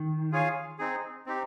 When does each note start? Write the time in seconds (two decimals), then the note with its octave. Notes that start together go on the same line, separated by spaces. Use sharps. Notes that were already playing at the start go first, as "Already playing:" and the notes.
Already playing: D#3
0.32 F4 G#4 C#5 F5 G#5
0.79 C4 D#4 G#4
1.26 C4 D#4 G4